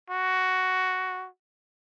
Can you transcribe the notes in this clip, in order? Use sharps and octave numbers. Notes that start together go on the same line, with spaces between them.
F#4